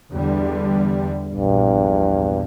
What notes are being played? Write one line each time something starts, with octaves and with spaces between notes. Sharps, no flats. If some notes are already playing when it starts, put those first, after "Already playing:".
E2 D3 G3
A#1 E2 G2